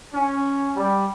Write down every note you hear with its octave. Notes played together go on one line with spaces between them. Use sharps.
C#4
G3